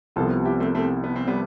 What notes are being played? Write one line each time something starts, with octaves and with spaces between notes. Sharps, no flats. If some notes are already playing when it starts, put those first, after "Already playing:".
C2 C3 F3 B3 F4 A4
E4 G4
A3 C4
A3 C4
B3
C4
G3 B3